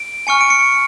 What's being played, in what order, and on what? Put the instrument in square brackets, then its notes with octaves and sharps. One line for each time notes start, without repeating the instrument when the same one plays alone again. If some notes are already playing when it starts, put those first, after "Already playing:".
Already playing: [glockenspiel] D7
G#5 C#6 F6 C#7
D7
C#7